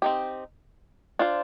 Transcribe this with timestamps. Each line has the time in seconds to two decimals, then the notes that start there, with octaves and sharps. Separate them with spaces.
0.02 C4 D#4 G4
1.19 D4 F4 C5